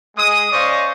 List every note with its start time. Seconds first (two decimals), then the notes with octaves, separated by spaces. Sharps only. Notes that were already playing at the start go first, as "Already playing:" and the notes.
0.17 G#3 D#6
0.52 C#4 C5 D5 D#5 F5 C#6